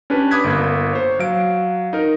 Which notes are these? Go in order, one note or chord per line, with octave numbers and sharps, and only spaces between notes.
C#4 D4 G4 B4
B5 D6 D#6 F#6 G#6 B6
G1 A#3
C5 C#5
F#3 F5 D7
D#4 A#4